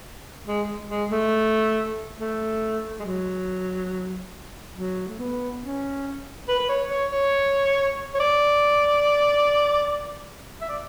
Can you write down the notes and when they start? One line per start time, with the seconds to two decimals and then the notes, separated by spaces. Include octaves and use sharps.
0.47 G#3
0.89 G#3
1.11 A3
2.18 A3
3.00 G#3
3.05 F#3
4.76 F#3
5.07 A3
5.19 B3
5.62 C#4
6.48 B4
6.59 B4
6.69 C#5
6.90 C#5
7.12 C#5
8.14 C#5
8.20 D5
10.61 E5
10.69 D5